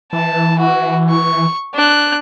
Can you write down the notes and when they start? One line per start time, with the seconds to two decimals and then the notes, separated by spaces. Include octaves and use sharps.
0.13 E3 A5
0.59 F#4
1.10 C#6
1.74 D4 F#6